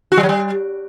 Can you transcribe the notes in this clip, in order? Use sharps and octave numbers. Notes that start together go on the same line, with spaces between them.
F#4
G3
F#3
G3